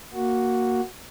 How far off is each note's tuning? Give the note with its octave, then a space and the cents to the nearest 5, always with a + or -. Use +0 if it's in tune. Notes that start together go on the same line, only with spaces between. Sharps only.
A#3 +0 F#4 +0